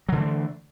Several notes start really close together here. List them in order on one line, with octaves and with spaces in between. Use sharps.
F#3 D3 A3 E3